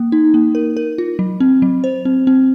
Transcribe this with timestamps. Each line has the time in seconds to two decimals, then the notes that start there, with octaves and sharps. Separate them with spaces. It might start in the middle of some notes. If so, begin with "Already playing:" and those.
Already playing: A#3
0.12 D#4
0.34 A#3
0.55 A#4
0.77 A#4
0.98 F4
1.19 F#3
1.40 C4
1.62 F#3
1.84 C5
2.05 C4
2.27 C4